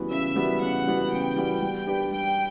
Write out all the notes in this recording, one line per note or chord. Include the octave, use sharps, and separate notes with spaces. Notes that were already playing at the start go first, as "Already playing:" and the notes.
Already playing: C#3 E3 G3 B3 F#4
C#3 E5
E3 G3 B3 F#4
C#3 F#5
E3 G3 B3 F#4
C#3 G5
E3 G3 B3 F#4
G3
D4 G4 B4
G3 G5